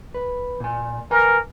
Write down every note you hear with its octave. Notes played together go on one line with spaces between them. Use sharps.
B4
A#2 G#5
A#4 B4 G#5